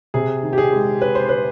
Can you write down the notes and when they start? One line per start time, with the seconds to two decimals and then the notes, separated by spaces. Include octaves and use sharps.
0.14 C3 G#4
0.43 D#3
0.53 G4
0.58 G#4
0.73 G#3
1.01 G#3 B4
1.15 C5
1.29 B4